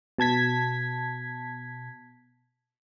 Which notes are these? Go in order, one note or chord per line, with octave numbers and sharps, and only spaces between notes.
B2 A5 G#6 B6